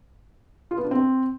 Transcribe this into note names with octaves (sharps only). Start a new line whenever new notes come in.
F4
B3
D4
C4